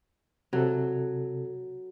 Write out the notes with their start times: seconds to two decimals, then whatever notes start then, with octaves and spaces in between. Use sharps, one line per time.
0.53 C3 F#3 A4